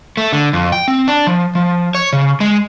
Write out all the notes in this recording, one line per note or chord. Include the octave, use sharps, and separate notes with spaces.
A3
D3
F2
G5
C4
D4
F3
F3
C#5
C#3
G#3